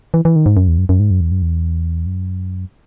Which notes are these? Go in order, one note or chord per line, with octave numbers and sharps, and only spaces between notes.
E3
E3
D#3
G#2
F#2
E2
F#2
F#2
G#2
F#2
E2
F#2
E2
F#2